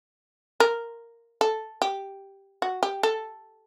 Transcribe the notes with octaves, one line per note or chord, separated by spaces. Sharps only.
A#4
A4
G4
F#4
G4
A4